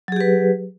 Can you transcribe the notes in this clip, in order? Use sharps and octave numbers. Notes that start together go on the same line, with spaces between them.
F#3 G4 G#4 B4